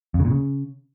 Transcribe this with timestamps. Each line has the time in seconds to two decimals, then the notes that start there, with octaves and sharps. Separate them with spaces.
0.14 F2
0.20 C#3
0.25 A#2
0.30 C#3